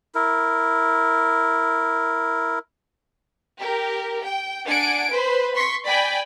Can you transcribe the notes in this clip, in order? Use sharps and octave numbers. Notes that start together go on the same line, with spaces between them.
E4 A#4
G4 A#4
G5
D4 F#5 G#5 D7
B4 C5
C6 C#6 B6
D5 G5 G#5 B5